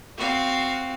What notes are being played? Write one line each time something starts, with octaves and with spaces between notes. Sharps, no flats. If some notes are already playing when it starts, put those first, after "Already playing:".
C4 F#4 F5